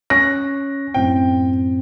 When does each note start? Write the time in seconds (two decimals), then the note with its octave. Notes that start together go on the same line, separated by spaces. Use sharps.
0.10 C#4 C#6 F#6 A#6
0.94 F#2 A2 C4 G5